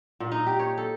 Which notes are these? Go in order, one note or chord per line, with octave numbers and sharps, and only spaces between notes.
A#2
D#4
G4
C#5
A4